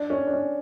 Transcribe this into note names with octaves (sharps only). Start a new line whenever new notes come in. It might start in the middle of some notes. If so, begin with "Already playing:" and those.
Already playing: D4
C#4
D4
C#4